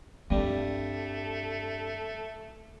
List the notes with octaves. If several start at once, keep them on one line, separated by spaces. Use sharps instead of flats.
G2 G3 A3 C4 D#4